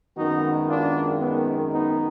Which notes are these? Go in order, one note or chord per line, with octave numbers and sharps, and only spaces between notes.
G#1 F#2 D#3 G#3 B3 D#4 F#4
D4 F4
B3
B3 D#4